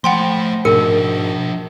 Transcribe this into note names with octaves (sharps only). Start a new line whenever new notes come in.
F3 A3 F#5 G5 B5 C6
G#2 B2 F3 D4 A#4 C#7